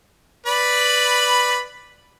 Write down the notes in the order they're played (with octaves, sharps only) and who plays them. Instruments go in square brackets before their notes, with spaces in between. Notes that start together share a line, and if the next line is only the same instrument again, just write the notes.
[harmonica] B4 D5 B5